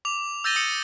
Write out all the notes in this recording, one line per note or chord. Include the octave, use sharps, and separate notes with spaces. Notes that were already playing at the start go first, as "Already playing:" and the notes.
D6 F7
E6 G6 A6 A#6 D#7 G7
D#6 C#7